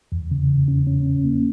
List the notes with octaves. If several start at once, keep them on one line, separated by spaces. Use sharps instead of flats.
E2
C#3
E2
C#4
C#4
C#4
A#3